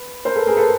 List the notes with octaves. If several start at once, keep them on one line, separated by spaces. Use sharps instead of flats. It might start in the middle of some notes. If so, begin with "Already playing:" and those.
Already playing: B4
A#4 C5
A4 B4
G#4 A#4
A4 B4